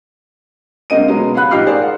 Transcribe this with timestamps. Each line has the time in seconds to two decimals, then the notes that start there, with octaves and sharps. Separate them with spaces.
0.90 D2 G#3 A#3 C4 D#5 D#7
1.08 B2 F#3 G#3 B3 C#4
1.34 C#4 F5 F#5 B5 F#6
1.51 A1 F3 D#4 G4 F6 C7
1.66 G#4 A#4 C5 D5 F5
1.82 F#5